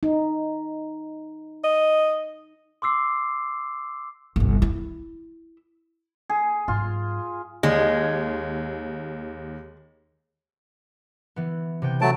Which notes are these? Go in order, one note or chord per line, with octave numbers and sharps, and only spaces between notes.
D#4
D#5
C6 D6 E6 C7
G1 C2
E4
G#4
G#2 F#3 F4
D#2 G#3
E3 B3
C3 B3 G5
F#3 A3 A5 D7